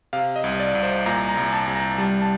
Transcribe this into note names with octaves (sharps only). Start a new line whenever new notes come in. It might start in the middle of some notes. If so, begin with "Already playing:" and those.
C3 F5
D#5
C2
D5
C2
C5
A#2 A#5
A#5
C2
A5
C2
A#5
G3 A5
A5